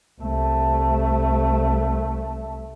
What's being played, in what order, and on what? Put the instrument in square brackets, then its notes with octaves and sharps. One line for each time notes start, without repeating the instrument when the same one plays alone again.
[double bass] C2 A3